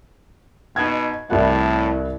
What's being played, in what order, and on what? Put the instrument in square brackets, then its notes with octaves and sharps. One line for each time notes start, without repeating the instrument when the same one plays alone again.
[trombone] B2 [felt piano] D#4 G#6
[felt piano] C2 E4 F#5 [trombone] A2